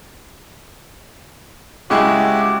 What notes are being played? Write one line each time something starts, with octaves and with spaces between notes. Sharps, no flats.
C#3 G#3 E4 F#4 G4